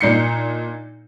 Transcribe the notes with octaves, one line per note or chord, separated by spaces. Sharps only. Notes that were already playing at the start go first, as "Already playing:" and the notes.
A#2 D4 D#4 G6 C7 C#7